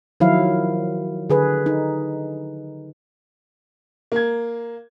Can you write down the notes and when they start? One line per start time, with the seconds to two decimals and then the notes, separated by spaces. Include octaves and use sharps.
0.20 D#3 F3 F#3 E4 F5
1.30 D3 G#4 B4
1.66 D#4
4.12 A#3 G#6